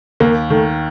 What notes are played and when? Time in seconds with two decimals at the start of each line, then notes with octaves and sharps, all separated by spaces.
0.20 D#2 A#3
0.50 D#3 A3